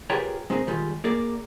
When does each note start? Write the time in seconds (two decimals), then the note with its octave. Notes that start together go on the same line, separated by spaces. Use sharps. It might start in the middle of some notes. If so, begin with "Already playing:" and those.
0.10 F4 G4 G#4 A#4 B4 C#5
0.50 G#3 C4 D#4 G#4 A#4
0.67 D#3 G3 G#3 F4
1.04 A#3 G#4 A#4 D5